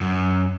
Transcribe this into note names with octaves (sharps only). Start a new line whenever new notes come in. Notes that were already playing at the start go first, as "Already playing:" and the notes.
F#2